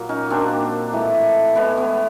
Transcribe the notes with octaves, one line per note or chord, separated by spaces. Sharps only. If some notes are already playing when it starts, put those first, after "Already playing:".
Already playing: A#2 F#3 A#3
C#4 D#4
A#2 F#3 A#3 C4 D4
A2 E3 G#3
A2 E3 G#3 B3
B3